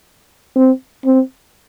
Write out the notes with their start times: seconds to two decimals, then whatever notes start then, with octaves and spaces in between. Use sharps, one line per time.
0.56 C4
1.05 C4